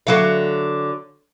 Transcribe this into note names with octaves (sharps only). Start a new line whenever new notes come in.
D3 F#3 F5